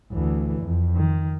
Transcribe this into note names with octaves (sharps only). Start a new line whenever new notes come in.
D2 E3
F2
D#3